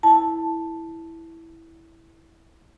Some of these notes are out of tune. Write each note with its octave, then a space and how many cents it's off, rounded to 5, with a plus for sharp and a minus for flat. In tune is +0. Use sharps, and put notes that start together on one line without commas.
E4 -5 A5 +0